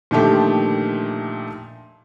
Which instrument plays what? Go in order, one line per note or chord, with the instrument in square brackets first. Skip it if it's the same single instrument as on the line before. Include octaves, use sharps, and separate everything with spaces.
[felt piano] A#2 D3 D#3 F3 A3 G4